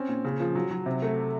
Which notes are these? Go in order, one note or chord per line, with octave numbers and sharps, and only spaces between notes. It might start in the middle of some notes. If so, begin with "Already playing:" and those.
Already playing: C4 C#4
A#2
C#3
F3
F#3
F#3
C3
A3